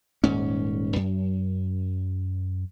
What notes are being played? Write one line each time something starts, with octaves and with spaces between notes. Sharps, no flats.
D#1 G#2 C#4
F#2